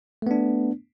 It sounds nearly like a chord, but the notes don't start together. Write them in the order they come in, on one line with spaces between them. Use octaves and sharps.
A3 B3 D4